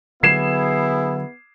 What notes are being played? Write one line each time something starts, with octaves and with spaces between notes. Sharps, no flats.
D3 F#3 B3 E4 G#4 G#6 C7 E7